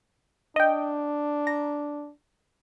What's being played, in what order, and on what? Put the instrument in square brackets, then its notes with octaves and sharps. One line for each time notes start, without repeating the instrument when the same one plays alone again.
[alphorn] D4 [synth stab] D#5 G5
[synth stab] A#5